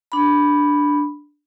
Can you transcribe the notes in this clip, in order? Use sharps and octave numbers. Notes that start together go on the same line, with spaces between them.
D4 B5